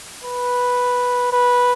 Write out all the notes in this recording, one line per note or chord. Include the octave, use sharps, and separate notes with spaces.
B4
B4